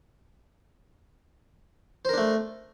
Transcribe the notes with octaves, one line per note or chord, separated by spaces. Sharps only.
A3 D4 A#4 C5